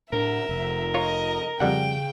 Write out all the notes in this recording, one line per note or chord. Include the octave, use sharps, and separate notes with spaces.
A2 D4 A#4 E5
F1
F4 C#5 D#5 A#5
F2 C#3 G3 F#5 G5